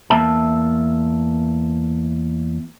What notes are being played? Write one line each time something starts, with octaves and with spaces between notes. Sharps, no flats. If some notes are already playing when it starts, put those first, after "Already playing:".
E2 A#3 E5 A5